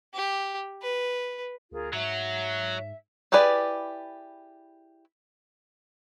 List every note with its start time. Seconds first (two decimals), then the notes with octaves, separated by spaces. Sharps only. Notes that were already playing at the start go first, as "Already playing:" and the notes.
0.14 G4
0.81 B4
1.72 D2 F4 G#4 A#4
1.93 G#2 F#3 E5
3.32 E4 G4 G#4 B4 D5